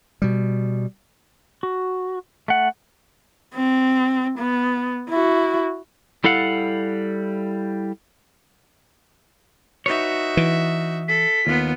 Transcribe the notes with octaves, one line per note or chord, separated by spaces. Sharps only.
B2 G3
F#4
A3 F#5
C4
B3
E4 F#4
G3 E4 A4 F5 F#5
D#4 F#4 B4 C#5 E5
E3
A4 B6
D#2 B3 F4